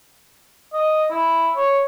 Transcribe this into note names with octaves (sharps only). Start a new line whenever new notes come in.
D#5
E4
C#5